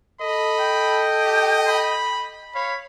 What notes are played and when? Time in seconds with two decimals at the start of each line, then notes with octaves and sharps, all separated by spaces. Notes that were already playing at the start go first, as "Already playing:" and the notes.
0.21 A4 D#5 B5
0.59 G5
1.25 G4
1.68 B5
2.55 C#5 F5 B5